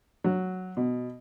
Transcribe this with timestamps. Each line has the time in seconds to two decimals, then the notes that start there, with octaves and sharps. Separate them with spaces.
0.24 F#3
0.77 B2